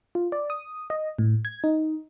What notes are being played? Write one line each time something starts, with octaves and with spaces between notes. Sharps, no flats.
F4
D5
D#6
D#5
A2
G#6
D#4